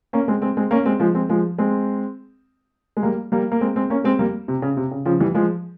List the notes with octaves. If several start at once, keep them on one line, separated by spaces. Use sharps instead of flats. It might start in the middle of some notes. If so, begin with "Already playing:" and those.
A#3 C#4
G#3 C4
G#3 C4
G#3 C4
A#3 C#4
G#3 C4
F3 G#3
G#3 C4
F3 G#3
G#3 C4
G#3
G3 A#3
G3 A#3
A#3
G#3 C4
G#3 C4
A#3 C#4
G#3 C4
G3 A#3
C3
C#3
C3
C#3
C#3 F3
E3 G3
F3 G#3